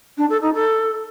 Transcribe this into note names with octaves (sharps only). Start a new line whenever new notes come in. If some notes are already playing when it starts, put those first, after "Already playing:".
D4
A4
D#4
A4